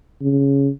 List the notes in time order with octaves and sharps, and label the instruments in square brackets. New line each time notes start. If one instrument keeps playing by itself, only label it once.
[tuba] C#3